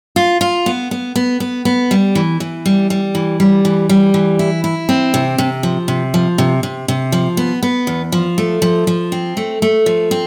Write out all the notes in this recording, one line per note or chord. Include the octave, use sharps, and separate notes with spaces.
F4
F4
B3
B3
B3
B3
B3
G3
E3
E3
G3
G3
E3
G3
E3
G3
E3
E4
E4
C4
C3
C3
F3
C3
F3
C3
C3
C3
F3
B3
B3
E2
F3
A3
F3
F3
C4
A3
A3
F3
C4